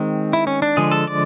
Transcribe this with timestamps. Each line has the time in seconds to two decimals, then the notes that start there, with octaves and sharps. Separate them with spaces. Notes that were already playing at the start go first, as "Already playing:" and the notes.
Already playing: D#3 G#3 C4
0.33 E4
0.47 C#4
0.62 D4
0.77 D3 F3 G#3 G#4
0.91 A4
1.07 D5